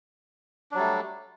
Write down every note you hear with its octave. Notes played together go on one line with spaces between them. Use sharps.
F#3 G3 A3 D4